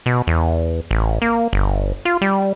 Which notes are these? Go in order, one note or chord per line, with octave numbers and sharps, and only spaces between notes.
B2
E2
A1
A#3
G1
F4
G3